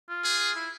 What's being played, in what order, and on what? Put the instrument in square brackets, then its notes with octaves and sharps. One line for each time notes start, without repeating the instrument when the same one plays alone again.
[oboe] F4
[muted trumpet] G#4
[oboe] E4